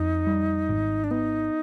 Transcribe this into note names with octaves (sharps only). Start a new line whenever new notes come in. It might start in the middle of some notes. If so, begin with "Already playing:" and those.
Already playing: F2 D#4
G3
G#1
D4
B3 D#4